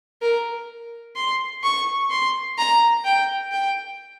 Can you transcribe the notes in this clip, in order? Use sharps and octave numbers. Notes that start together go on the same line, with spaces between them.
A#4
C6
C#6
C6
A#5
G5
G5